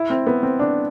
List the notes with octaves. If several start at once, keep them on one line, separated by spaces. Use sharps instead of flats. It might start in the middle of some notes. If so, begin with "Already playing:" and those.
Already playing: E4
C4
B3
C4
D4